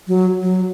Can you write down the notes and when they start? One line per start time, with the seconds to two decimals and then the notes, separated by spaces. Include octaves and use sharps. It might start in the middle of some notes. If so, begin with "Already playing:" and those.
0.08 F#3
0.42 F#3